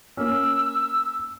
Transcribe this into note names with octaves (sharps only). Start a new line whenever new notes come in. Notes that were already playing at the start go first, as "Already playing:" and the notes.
A#3 C#4 E6